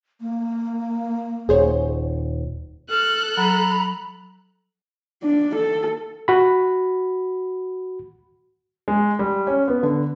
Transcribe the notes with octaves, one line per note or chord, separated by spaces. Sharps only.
A#3
D#1 G#4 C5 C#5
A4 F6 F#6
F#3 A#5 B5
D4
A4
F#4 B5
G#3
G3
C#4
B3
D3